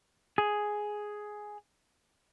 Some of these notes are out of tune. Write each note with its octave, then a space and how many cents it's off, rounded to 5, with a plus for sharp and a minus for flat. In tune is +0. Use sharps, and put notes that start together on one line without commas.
G#4 +5